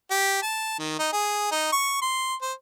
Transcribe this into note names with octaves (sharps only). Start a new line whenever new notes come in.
G4
A5
D#3
D#4
G#4
D#4
C#6
C6
C5